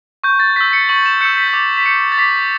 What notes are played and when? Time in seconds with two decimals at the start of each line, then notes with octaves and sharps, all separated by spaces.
0.24 C#6 G6
0.40 A6
0.56 E6 G6 B6
0.73 C#7
0.89 C#6 F#7
1.06 E7
1.21 E6 G6 C#7
1.38 B6
1.48 G6
1.54 D6 A6
1.77 B6
1.86 G6 C#7
2.12 A6
2.18 D6 B6